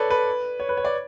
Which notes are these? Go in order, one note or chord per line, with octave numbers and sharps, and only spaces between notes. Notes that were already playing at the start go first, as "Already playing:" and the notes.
Already playing: A4 B4 C#5 D5
B4
C#5
B4
C#5
D5